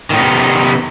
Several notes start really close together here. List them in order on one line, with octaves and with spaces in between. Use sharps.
D#3 A2 D#4 B3 C3